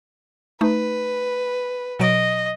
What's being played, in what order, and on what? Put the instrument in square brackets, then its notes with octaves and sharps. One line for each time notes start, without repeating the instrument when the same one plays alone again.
[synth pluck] A3 D#4 [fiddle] B4
[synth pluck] B2 F#3 D7 [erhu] D#5